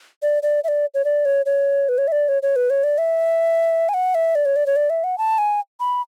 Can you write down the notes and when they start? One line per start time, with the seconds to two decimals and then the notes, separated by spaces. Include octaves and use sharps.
0.22 D5
0.43 D5
0.64 E5
0.68 D5
0.94 C#5
1.05 D5
1.25 C#5
1.46 C#5
1.89 B4
1.98 C#5
2.08 E5
2.12 D5
2.29 C#5
2.43 C#5
2.56 B4
2.70 C#5
2.84 D5
2.98 E5
3.89 G#5
3.94 F#5
4.15 E5
4.35 D5
4.45 C#5
4.56 D5
4.66 C#5
4.76 D5
4.90 E5
5.04 F#5
5.18 A5
5.38 G#5
5.80 B5